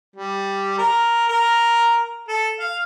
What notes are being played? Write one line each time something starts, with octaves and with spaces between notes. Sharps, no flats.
G3
A#4
A#4
A4
F5